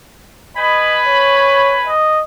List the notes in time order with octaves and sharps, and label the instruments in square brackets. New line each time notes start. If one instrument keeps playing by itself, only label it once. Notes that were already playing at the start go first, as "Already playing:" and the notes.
[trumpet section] B4 G#5 B5 [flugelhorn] D#5
[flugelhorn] C#5
D#5